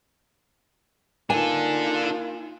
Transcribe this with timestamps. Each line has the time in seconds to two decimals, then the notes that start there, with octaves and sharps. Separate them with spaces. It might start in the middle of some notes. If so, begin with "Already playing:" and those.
1.30 A#3 D4 D#4 F4 A4 G#5